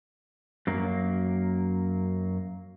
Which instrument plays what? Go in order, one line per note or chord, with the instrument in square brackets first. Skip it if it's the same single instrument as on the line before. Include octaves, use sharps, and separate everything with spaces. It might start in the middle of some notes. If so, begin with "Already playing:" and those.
[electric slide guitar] F#2 F#3 A#3